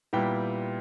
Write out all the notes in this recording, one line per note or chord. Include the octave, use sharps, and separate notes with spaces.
A#2 G3 B3 E4 G5